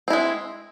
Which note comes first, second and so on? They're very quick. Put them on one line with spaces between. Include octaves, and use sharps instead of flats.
C4 E4 G#3